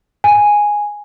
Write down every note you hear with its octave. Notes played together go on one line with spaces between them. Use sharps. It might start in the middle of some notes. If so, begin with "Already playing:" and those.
G#5